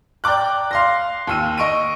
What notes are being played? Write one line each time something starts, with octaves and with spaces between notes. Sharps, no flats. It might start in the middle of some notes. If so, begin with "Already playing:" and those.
D5 G5 A#5 D6 F#6
F5 C6 A#6
D#2 E6 D#7
D#5 C#6 D7 D#7